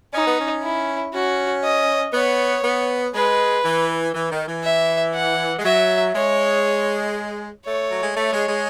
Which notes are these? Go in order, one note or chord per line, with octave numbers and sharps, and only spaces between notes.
C#4 D#4
B3
C#4
E4
C#4 F#4
D#5
B3 C#5
B3
G#3 B4
E3
E3
D#3
E3
E5
F#5
G#3
F#3 E5
G#3 C#5
A3 C#5
F#3
G#3
A3 C#5
G#3
G#3